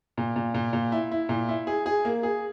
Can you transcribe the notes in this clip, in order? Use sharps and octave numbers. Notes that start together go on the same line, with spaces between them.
A#2
A#2
A#2
A#2
E4
E4
A#2
E4
G#4
G#4
A#3
G#4